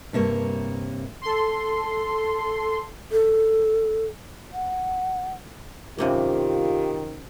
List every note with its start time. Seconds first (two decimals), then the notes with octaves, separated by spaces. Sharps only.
0.13 G2 C3 A#3 C#5
1.22 A4 C6
3.12 A4
4.53 F#5
5.98 F#2 C3 D#3 A#3 F4 G4